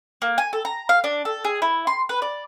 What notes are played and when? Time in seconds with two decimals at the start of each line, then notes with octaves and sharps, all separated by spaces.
0.22 A#3
0.38 G#5
0.53 A4
0.65 A#5
0.89 F5
1.04 D4
1.25 A4
1.44 G#4
1.62 E4
1.87 C6
2.09 B4
2.22 D5